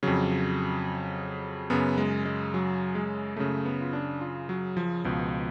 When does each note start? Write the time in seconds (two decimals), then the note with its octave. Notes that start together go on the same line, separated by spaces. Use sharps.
0.03 F2 C#3 F#3
1.70 F#2 C#3 B3
1.98 G#3
2.25 G#3
2.54 F#3
2.95 G#3
3.37 F#2 C#3 A3
3.65 B3
3.81 F4
3.93 D4
4.21 F4
4.49 F#3
4.77 F3
5.05 C#2 B2 F3